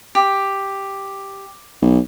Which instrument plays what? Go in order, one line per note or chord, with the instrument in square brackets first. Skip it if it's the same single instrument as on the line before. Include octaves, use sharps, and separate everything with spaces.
[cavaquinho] G4
[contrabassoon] B1